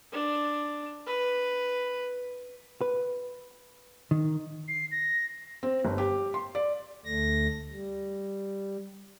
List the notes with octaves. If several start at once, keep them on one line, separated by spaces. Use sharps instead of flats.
D4
B4
B4
D#3
C7
A#6
C4
G1
G4
C6
D5
D2 A3 A#6
G3